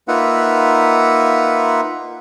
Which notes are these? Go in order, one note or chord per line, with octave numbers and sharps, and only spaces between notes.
A#3 D#4 F4 B4 E5 F#5